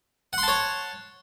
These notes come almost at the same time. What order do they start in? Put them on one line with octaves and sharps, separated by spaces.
F#5 C6 A5 C#5